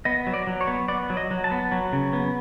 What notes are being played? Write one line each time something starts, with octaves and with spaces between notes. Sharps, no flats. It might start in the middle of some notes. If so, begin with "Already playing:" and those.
B3 D#5
F#3
D5
F#3
C#5
B3
B3 D5
F#3
D#5
F#3
A5
B3
F#3
C#3
B3